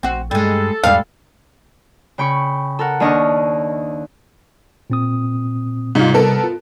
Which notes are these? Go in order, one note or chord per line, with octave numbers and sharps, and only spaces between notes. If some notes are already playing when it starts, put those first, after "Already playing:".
A#1 C4 F#4
G2 G3 G#3 A4
E2 G#2 G3 D4 F5
C#3 G5 B5 C#6
A4 A#4 F#5
D#2 D4 D#5 A5 C#6 F6
A#2 C4 D#6
G#2 C3 G3 F4
B3 A4 A#4
F4